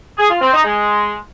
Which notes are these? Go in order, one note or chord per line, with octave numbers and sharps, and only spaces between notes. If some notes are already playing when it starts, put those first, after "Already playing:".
G#4
F4
C4
D#4
G#3